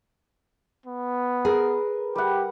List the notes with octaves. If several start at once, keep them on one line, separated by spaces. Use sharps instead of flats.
B3
G#4 A#4 B4
G3 G4 F#5